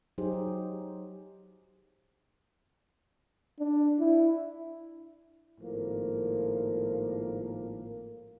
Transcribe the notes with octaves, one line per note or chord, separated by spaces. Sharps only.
F#3 D#4 G4 G#4 C5
D4
E4
G#1 A2 F3 A#3